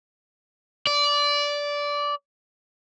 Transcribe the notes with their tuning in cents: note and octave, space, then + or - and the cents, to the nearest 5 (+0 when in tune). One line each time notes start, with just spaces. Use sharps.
D5 -15